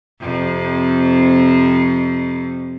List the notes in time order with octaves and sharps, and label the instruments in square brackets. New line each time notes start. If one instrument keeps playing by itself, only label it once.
[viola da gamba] F2 C3